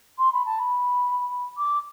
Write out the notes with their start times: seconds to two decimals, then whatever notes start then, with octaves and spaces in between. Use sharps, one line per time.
0.18 C6
0.32 B5
0.45 A5
0.58 B5
1.58 D6